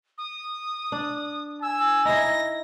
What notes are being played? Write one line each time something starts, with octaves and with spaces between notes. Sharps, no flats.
D#6
D4
G#5 E6
D#4 E4 A#6